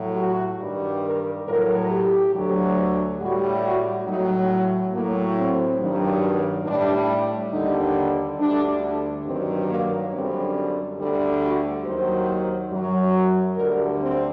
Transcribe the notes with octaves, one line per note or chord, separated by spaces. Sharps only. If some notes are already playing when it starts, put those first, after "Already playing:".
Already playing: A2 F#3
F#4
G2 D#3 G3
A#4
A2 F#3 A#4
G4
D2 D3 F#3
A2 G3 F#4
F#4
A2 F#3 D#4
A2 F#3 A#3
C4
G2 D#3 F#3
A2 G3 D4
D#2 D3 G3 D#4
D2 D3 G3 D4
G2 D#3 F#3 C4
A#3
F#2 D3 G3 C4
D2 D3 G3
F#4
D#2 D#3 F#3 C5
F#2 F#3
D2 D3 G3 A#4
C4